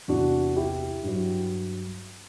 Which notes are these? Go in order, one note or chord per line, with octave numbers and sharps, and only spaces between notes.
E2 C3 E3 D4 F#4
E4 G4
G2 F#3